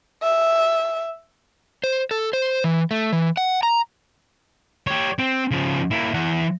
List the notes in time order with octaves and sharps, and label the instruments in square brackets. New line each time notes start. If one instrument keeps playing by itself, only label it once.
[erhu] E5
[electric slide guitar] C5
A4
C5
E3
A3
E3
F#5
A#5
[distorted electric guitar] G4 C#5
C4
C#3 F3
A#3 E4
E3 F#5